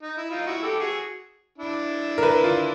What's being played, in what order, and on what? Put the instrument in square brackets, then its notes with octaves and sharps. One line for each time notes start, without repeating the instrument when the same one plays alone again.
[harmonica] D#4
E4
D#4 F4
E4 F#4
G4 A4
F#4 G#4
D4 E4
[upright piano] A#4
B4
F4